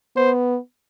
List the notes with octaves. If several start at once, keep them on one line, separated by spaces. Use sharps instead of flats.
B3 C5